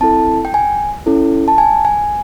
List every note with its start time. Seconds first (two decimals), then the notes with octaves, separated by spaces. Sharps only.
0.01 C4 E4 A4 A5
0.45 G5
0.54 G#5
1.06 C#4 E4 A4
1.48 A5
1.58 G#5
1.85 G#5